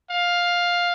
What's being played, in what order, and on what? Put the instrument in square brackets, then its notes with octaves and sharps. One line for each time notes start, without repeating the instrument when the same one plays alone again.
[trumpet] F5